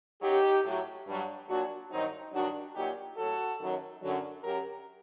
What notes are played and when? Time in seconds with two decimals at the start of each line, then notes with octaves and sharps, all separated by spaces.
0.21 F#2 F#3 D#4 G4
0.63 A2 F#3
1.06 G2 F#3
1.48 A#2 F#3 D4 F#4
1.90 G2 D#3 F#3 C4 D#4
2.32 G2 D#3 F#3 D4 F#4
2.75 A#2 F#3 D#4 G4
3.16 A2 F#3 F#4 A4
3.59 F#2 D#3 F#3
4.01 F#2 D3 F#3
4.43 F#2 F#3 G4 A#4